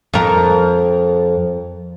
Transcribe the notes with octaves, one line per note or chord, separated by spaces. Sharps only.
F2 A#4